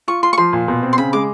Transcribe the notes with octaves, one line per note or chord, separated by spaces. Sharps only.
F4 C#6
F4 C6
C#6
F3 C6
A#2
B2
C4
C6
C#3 B5
G#3 D6